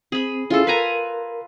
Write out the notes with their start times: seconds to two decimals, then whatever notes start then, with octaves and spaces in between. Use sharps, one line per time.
0.12 C4 G#4 B5
0.50 C#4 E4 F4 G#4 A4
0.67 A#4 B4 G#5 A#5